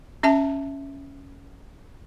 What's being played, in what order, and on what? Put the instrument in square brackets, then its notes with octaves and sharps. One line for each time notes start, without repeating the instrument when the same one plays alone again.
[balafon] C#4 E5 A5